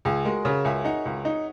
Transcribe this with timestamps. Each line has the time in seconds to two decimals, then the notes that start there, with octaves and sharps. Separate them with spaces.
0.05 C#2 G#4
0.25 G#3 F#4 A#4
0.45 C#3 A#4 C#5
0.65 C#2 E5 G#5
0.85 D#4 F#5 A#5
1.05 C#2
1.25 D#4